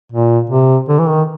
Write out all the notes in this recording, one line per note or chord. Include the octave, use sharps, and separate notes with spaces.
A#2
C3
D3
E3
D#3